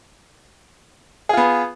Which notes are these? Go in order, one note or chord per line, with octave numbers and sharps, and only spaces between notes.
B3 F4 G#4